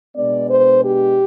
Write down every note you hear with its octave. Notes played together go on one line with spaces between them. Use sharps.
B2 G#3 B3 D4 D5
C5
G4